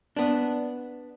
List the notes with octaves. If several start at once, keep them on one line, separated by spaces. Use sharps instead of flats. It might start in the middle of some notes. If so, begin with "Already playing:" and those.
B3 D4